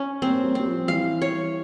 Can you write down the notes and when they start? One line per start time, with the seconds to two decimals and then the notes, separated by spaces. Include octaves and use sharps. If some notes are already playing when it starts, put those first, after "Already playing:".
Already playing: C#4
0.22 G3 A#3 C4
0.44 G3 A#3
0.55 G3 C4
0.66 F3
0.88 E3 G3 F5
1.22 C#5